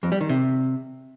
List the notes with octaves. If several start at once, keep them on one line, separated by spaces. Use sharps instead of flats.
F2
G3
D#3
C3